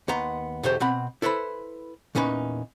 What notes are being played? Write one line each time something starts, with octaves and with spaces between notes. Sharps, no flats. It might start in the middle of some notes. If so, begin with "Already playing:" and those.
D#2 B3 A#5 C6
B1 E2 F#3 G4 C5
B2 C4 F#5 B5
E4 A4 B4 C5 B5
E2 A#2 C#4 D#4 B4